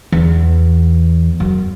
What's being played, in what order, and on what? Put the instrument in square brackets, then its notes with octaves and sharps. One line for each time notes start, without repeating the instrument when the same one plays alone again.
[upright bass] E2
F#2